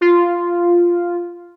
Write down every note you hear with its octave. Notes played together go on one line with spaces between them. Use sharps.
F4